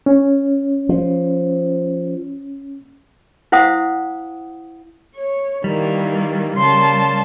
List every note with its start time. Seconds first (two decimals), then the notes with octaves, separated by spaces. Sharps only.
0.06 C#4
0.89 F3
3.52 E4 C5 F5 F#5 D#6
5.15 C#5
5.64 D#3 E3 G3 A#3
6.57 C#3 A#3 A5 C6